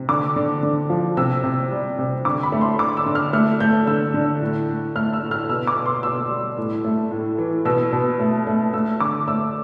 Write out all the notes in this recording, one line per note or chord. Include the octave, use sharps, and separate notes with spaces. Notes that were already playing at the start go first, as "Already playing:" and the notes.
Already playing: C3
D3 D6
D3
D3
F3
C3 E6
C3
G3
C3
D3 D6
B5
A3
C6
D3 D6
E6
D3
F6
A3 F6
A3 G6
D3 E6
D3
A2
A2
A3 F6
E6
A2
F6
B2 E6
D6
B2
C6
B2 E6
G3
A2
A3
A2
E3
B2 E6
B2
A3
A3
A3 E6
D3 D6
A3 E6